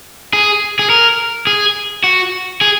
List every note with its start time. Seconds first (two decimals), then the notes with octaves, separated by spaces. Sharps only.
0.33 G#4
0.79 G#4
0.90 A#4
1.47 G#4
2.04 F#4
2.61 G#4